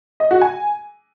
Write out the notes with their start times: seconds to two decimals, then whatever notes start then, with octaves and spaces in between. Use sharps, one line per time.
0.20 D#5
0.31 F#4
0.41 G#5